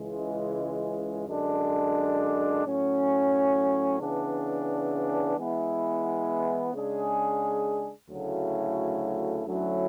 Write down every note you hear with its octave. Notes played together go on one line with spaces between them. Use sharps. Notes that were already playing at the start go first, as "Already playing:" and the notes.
Already playing: C#2 C#3 E3 G#3
F#2 D3 G#3 D4
A2 F#3 C#4
C#3 E3 B3 D4
E3 G#3 B3 E4
C#3 G#3 D4 G#4
D2 C#3 F#3 A3 E4
D2 D3 F#3 C#4 E4